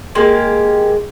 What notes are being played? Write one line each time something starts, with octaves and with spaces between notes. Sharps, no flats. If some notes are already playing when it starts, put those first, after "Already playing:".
G#3 A#3 G4